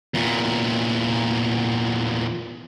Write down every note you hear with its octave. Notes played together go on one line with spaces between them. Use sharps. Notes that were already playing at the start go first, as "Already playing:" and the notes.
E2 A#2